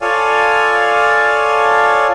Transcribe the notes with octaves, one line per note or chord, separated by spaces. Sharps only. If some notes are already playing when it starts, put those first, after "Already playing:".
F4 A4 C#5 D5 F5 G#5